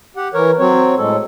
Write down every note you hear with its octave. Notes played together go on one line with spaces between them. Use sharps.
G4 F#5
E3 A#4 C#5
F#3 C4 C#5
A2 G#3 A4